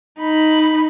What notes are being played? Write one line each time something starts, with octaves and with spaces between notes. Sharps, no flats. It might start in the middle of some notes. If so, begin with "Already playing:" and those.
D#4 B5